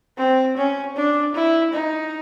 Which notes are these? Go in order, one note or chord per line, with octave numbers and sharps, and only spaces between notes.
C4
C#4
D4
E4
D#4